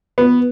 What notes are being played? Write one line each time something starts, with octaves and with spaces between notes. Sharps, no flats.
B3